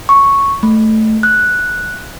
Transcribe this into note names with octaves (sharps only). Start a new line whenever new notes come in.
C#6
A3
F#6